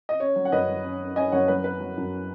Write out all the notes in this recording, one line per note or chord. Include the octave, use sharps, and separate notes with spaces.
D#5
C#4 C#5
F#3
F#5
F#2 B4 D#5
F#3
C#4
C#4
C#4 D#5 G#5
F#2 C#5 F#5
F#3 B4
B3 B4
F#3
F#2